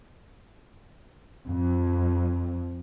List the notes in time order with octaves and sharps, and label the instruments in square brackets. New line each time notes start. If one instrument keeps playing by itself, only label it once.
[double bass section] F2